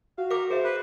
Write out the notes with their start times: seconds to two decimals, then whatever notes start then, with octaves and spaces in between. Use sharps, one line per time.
0.18 F#4 F5
0.30 A#4 F5 G5 D6
0.50 G#4 C5 E5
0.64 B4